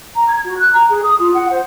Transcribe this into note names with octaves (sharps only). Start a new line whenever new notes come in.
A#5
G#6
F#4
F#6
A#5
G#4
D#6
F4
F#5
C5